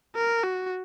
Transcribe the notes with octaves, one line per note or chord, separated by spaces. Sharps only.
A#4
F#4